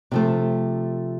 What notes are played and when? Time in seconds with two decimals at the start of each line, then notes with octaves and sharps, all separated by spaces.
0.11 C3 F3 A3